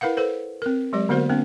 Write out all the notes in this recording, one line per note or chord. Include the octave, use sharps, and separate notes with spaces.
E4 A#4 B4 F5 F#5
A4 B4 C5
C4 A#4
F#3 G#3 G4 D5
D3 A#3 B3 F#4 A#4 C5
A#3 C4 D4